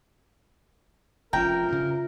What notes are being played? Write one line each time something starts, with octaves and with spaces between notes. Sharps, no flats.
F1 C4 C#4 F4 A#4 E5 G5 A#5
G2 C#3